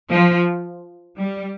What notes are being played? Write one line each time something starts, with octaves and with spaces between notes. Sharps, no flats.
F3
G3